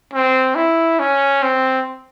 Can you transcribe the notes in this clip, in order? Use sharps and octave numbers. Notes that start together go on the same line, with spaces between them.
C4
E4
C#4
C4